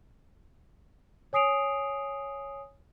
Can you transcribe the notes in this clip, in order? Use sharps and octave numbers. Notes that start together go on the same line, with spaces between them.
C#5 G#5 D#6 C7 D7 F7